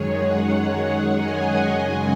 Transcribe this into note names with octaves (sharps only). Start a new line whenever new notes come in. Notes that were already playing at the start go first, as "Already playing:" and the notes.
Already playing: F#2 D#3 G#3 G#4 C#5
C#5 F#5
D#5 G#5
F#2 C#3 G#3